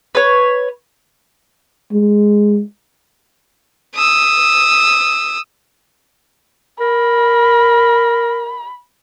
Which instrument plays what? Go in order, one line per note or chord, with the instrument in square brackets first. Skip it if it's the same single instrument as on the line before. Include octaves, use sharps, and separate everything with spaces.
[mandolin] B4 C#5
[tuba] G#3
[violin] D#6 E6
[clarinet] A#4 [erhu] B5